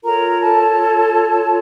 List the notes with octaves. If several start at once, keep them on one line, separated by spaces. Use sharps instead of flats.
F4 A4 A#4 C#5 A#5
A4 A5
A5